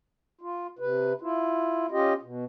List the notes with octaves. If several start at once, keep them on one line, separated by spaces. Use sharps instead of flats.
F4
C3 B4
E4 F4
C#4 F4 G4 D#5
B2